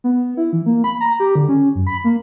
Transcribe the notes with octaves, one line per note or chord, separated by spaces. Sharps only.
B3
E4
E3
A#3
B5
A#5
G4
D3
C#4
F#2
B5
A#3